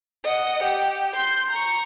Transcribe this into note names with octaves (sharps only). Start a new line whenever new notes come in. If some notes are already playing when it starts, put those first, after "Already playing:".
D#5 F#5
G4
C6 G6
A#5 C#6